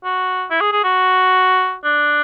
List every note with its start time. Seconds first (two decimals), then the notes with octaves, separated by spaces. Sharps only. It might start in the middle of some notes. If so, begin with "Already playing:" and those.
0.04 F#4
0.50 E4
0.61 G#4
0.72 G#4
0.84 F#4
1.84 D4